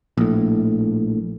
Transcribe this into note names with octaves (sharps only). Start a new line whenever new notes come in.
A#1 A2